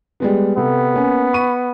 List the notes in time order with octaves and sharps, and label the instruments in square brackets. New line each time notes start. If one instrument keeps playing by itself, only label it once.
[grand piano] G3 G#3 B3
[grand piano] C3 A4 [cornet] B3
[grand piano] A#3 C#4 G#5
B5 C#6 D#7